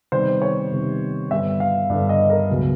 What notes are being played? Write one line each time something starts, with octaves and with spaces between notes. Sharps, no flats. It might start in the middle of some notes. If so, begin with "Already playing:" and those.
C3 D#3 G3 B3 C5
C#5
C3 D#3 G3 B3
G2 D3 G3 B3 E5
F5
G2 D3 G3 B3
D#5
A#4
C#2 B2 F#3 B3